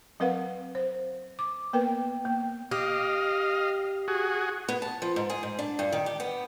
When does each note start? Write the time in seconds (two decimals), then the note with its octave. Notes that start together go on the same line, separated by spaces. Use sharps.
0.20 F#3 C4 A#4 B4 F5 F#5
0.75 C5
1.39 D6
1.73 A#3 B3 A#4 B4 G5
2.25 A#3
2.71 G4 D#5 F5
4.08 F#4 G#4
4.68 B3
4.82 A5
5.02 F3
5.16 G#2
5.30 G#4
5.43 G#2
5.59 D4
5.79 G2
5.92 D#3
6.06 G4
6.20 B3